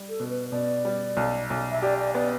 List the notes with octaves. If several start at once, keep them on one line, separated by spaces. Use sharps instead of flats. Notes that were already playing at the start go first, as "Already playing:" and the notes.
Already playing: G3
A4
B2
B4
B2 D5
G3
B1
B1
E5
G4 D5
D5
B3 D5